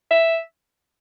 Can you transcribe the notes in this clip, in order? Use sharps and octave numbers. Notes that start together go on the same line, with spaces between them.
E5